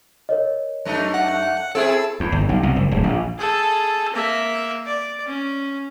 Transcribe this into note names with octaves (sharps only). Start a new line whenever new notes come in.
A#4 C#5 D#5
F#2 A3 D#4
F#5
C4 E4 G#4 A4 E6
E2
G1
B1
C2
F#1
D1
A#1
G#4 A4
A#3 E5
D5
C#4